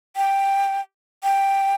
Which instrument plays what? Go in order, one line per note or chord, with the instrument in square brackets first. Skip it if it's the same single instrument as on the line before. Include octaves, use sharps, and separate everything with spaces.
[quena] G5
G5